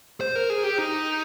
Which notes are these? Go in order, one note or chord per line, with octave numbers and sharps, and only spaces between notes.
C5
A#4
G#4
G4
D#4